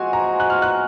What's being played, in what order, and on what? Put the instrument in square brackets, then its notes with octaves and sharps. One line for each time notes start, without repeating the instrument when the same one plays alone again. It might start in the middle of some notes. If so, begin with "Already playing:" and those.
Already playing: [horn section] F3 G#3 C4 F#4 [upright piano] G#5
[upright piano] A#5
F#6
F6
F#6